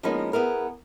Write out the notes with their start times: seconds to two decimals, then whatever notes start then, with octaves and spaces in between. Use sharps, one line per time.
0.03 F3 G#3 A#3 B3 C#4 D#4
0.33 B3 E4 G#4 A#4